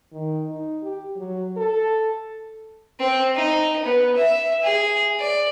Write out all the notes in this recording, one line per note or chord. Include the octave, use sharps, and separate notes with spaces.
D#3
D#4
G4
F#3
A4
C4
D#4
B3
E5
G#4
D5